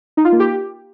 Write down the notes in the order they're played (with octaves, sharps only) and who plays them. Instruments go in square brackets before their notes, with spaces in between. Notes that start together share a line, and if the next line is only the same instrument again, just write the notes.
[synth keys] D#4
F4
A#3
G4